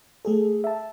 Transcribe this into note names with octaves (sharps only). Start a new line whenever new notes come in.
A3 G#4 A4
E5 A5